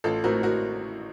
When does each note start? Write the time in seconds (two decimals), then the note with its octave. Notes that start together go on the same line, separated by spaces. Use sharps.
0.04 A1 F4 A4
0.24 A2 A3 C4 F#4 A#4
0.43 F#4 A#4